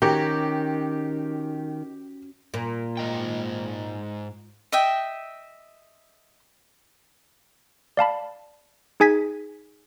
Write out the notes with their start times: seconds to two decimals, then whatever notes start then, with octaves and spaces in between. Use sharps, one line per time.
0.02 D#3 C#4 F#4 G4 C#5
2.54 A#2
2.97 G#2 D#5 G5
4.72 D#5 E5 G5
7.97 D5 F5 A5 B5
9.00 D#4 G#4 G#5 G#6 B6